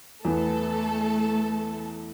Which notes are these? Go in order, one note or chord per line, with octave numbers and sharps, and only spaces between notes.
E2 E3 A3 B3 A4